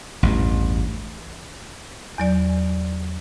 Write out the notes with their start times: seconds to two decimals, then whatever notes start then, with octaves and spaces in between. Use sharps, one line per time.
0.23 A1 E2 G2
2.18 E2 F#3 D5